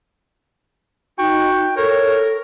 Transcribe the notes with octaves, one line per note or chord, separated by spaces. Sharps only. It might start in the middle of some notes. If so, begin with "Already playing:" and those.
D#4 F#4 G5
A4 A#4 C#5